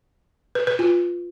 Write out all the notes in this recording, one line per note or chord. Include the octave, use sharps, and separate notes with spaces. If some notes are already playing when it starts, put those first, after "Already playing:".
B4
B4
F4